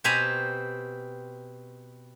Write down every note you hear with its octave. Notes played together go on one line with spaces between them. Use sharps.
B2 C4 G4 G#5 A#5 B5